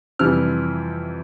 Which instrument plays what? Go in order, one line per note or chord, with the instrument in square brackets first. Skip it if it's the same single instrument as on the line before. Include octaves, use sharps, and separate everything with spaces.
[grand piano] F2 C3 E3 G3 F6